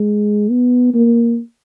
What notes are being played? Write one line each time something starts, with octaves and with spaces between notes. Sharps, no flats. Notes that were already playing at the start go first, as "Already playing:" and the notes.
Already playing: G#3
B3
A#3